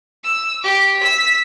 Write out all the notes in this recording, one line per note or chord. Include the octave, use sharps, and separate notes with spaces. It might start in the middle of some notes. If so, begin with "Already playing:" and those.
E6
G4 D6
E6 B6